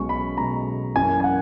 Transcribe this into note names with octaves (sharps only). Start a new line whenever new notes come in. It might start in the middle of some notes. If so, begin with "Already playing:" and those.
Already playing: B1 B2 G#3 C#4 C#6
B5
B1 B2 G#3 C#4 A#5
F#2 E3 A#3 C#4 G#5
G#5
F#5